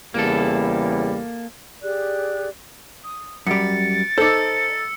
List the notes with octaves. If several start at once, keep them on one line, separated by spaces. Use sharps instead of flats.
E2 C#3 G3 A#3 A4
G4 G#4 D5 F#6
D#6
F#2 G3 A6 C#7 D7
D#4 A4 C5 D5 E6 C#7